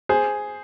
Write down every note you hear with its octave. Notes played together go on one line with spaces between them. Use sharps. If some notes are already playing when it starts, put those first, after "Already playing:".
G#4 C5